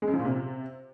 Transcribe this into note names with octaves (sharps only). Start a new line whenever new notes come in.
G#3
F#2
F3
A#2
C3